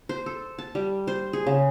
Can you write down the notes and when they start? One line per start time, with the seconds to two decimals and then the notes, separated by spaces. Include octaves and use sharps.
0.09 C5
0.26 A4
0.58 A5
0.75 G3
1.07 C5
1.33 G#4
1.47 C#3